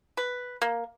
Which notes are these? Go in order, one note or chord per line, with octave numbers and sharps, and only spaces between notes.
B4
A#3